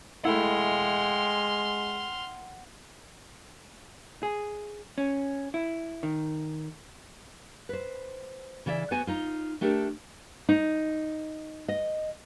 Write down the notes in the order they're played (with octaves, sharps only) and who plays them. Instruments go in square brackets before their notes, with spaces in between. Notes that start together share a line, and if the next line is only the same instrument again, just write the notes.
[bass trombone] G#3 [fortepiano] A3 E4 [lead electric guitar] F#5 G5 [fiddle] C6 F6
[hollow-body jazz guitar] G#4
C#4
E4
D#3
[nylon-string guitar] B4 C5
C#3 E3 D5 E5
B3 F#4 C5 G#5
D#4 F4
A3 D4 G4 A4 A#4
D#4
D#5